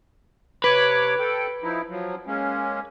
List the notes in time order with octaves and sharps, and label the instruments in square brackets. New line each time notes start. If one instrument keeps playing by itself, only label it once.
[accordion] C3 C#5 D6 [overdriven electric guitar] B4
[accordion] A4 G5
F3 D#4 E4
F3 F#3
G#3 A#3 C#4